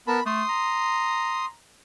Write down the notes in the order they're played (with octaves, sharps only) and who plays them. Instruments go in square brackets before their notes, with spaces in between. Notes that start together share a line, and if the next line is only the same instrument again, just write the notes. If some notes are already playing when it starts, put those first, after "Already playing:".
[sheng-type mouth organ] B3 A#4 A5 [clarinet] B5
[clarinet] A3 [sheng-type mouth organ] C6 D#6
[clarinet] A#5